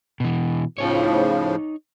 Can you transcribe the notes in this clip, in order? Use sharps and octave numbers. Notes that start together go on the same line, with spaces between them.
B2 E3
A2 C#3 F3 D#4 C#5